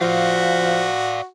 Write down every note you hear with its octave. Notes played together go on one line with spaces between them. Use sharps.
F3 F#4 D5 F5